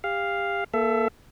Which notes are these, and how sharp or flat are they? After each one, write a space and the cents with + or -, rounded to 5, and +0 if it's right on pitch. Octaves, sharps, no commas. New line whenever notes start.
G4 +30 F5 +0
A#3 +10 A4 -15 E5 +25